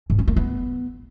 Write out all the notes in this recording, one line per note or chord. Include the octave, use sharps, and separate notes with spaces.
G#2
C#4
A#3
B3